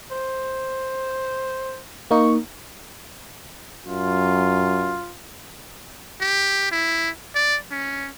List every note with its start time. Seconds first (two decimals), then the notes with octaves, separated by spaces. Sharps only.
0.11 C5
2.11 A#3 D#4 C#6
3.85 F#2 F4
6.21 G4
6.72 E4
7.35 D5
7.71 C#4